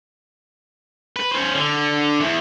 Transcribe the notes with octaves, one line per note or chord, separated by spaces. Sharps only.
B4
C#4 C5
D3
E2